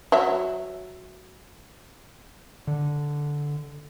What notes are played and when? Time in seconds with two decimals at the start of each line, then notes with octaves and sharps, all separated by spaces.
0.12 F#3 E5
2.67 D3